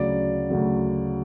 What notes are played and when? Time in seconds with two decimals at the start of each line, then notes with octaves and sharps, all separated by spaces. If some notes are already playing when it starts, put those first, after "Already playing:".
Already playing: D2 C#3 F#3 D5
0.50 D2 C#3 F#3